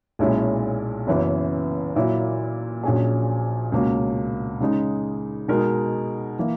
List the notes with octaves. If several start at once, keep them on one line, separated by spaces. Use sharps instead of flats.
B1 A#2 G#3 C#4 E4
F#1 F#2 E3 B3
A#2 F#3 A#3 E4
A#1 A#2 F#3 C#4 G#4
C#2 B2 A#3 C#4
C#3 G#3 D#4
B2 G#3 D#4 A#4
E3 A#3